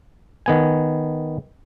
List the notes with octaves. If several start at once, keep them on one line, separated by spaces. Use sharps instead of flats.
D#3 B3 G#5